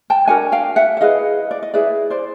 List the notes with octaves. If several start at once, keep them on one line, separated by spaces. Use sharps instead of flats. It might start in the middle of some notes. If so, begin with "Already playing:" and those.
G5 A5
D4 F#4 A#4 F#5 G#5
F5 G5
E5 F#5
E5
E4 G#4 B4 D#5 F5
D5
D#5
E4 G#4 B4 D5 E5
C5 D5